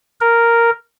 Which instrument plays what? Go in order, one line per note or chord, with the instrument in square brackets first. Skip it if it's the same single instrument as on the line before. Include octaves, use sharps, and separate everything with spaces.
[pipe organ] A#4